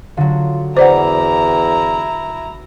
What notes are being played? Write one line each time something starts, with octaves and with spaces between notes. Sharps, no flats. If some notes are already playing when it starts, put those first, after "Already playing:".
D3 F#3 F4
E2 E4 C5 D5 F#5 A#5 D6